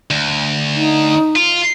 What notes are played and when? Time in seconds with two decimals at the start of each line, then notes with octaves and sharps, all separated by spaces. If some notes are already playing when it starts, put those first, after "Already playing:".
0.10 D2
0.76 D#4
1.36 F4